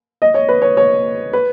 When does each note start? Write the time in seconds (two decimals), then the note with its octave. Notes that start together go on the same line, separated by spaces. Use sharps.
0.22 D#5
0.34 C#5
0.49 B4
0.62 C#5
0.77 C#5
1.33 B4